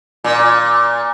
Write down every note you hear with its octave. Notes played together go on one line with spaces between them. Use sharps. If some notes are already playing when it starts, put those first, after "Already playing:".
A#2